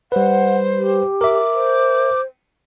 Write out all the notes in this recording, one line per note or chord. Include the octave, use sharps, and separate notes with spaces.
G3 B4 C5 F#5
G4
A#4 E5 D6
C5